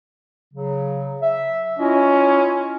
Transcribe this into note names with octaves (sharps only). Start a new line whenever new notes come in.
C#3 F#3
E5
C#4 E4 F4 D#5